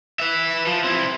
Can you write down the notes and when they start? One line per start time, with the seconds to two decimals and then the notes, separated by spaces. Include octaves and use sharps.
0.20 B4 E5
0.67 F3
0.84 C4 E4